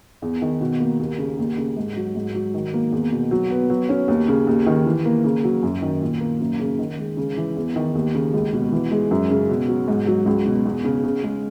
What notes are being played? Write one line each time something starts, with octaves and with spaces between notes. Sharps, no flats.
E2
D#3
B2
A#3
D#2
C#3
D#2
C#3
G#2
F#3
G#2
F#3
D#3
A#3
E2
B2
F#3
B3
F#3
C#4
D#2
C#3
D#2
D#3
E3
A#3
C#3
F#3
F#2
D#3
A#2
A#3
F#2
C#3
D#3
G#3
C#3
E3
E2
D#3
D#2
C#3
C#2
B2
E3
G#3
F#2
C#3
B2
F#3
G#2
F#3
C#2
B2
E2
C#3
C#3
G#3